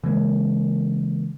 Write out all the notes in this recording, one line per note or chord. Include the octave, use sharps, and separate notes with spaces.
C#3 E3 G#3 A#3